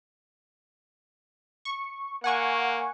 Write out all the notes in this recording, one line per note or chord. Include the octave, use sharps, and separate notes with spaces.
C#6
A#3 F#5 G#5 C#6